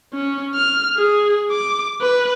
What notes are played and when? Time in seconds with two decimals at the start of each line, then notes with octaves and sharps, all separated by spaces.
0.13 C#4
0.55 F6
0.97 G#4
1.51 D6
2.01 B4